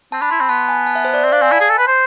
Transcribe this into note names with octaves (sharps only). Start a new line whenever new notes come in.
C4 A5
D4 B5
E4 C6
C4 B5
B3 A5
G#5
A5
E5
C5
D5
C4 D5
D4 F5
C4 G#5
E4 A5
G#4
A4
B4
C5